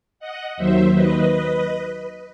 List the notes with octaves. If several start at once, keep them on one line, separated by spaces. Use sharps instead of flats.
D#5 F#5
D#2 D#3 F#3 C5 E5
B4 D#5